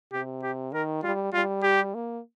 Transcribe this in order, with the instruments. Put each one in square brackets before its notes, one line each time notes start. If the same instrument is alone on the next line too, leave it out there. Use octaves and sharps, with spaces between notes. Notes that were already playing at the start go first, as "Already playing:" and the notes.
[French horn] C3 [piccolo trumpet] G4
[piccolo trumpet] G4
[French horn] D#3 [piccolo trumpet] A#4
[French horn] G3 [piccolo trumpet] F4
[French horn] G3 [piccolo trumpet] F4
[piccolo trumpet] G4
[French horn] A#3